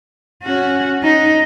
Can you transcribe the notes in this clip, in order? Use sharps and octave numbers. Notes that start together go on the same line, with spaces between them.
C#4 F#4
D#4